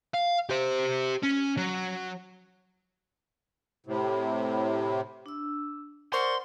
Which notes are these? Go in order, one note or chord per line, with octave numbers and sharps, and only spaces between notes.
F5
G4 C5
C#4
F#3
A2 C3
D4 E6
A#4 C5 D5 F#5 C6 C#6